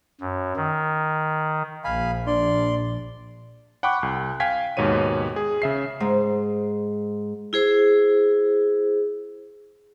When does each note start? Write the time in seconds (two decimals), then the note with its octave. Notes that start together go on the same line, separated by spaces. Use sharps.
0.21 F#2
0.56 D#3
1.84 A#1 F5 G#5 B5
2.27 D4 D5 C6
3.83 F#5 G5 B5 C#6 D6 F#6
4.03 C2
4.40 F5 G5 G#5 G#6 B6
4.77 D#2 G#2 B2 C#5 D#7
5.36 G#4
5.62 C#3 E5 C7
6.00 G#2
7.53 E4 G#4 C5